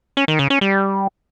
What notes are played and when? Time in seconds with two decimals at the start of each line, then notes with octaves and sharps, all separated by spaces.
0.17 C#4
0.28 D#3
0.39 C#3
0.50 C#4
0.61 G3